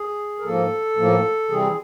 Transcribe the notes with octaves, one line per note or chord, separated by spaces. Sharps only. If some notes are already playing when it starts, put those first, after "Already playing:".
Already playing: G#4
A#4
G#2 F3 A#3 A4
A2 F3 A#3
C3 E3 G3 C4 G#4